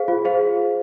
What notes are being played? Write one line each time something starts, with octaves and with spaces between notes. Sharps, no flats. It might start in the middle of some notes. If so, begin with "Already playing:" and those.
Already playing: G#4 C5 F5
F4
G#4 C5 F5